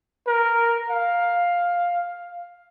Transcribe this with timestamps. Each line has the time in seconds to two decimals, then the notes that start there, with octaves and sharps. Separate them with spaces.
0.27 A#4
0.90 F5